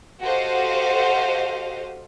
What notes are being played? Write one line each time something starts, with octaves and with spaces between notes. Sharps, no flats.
F#4 G4 A4 C5 D#5 F5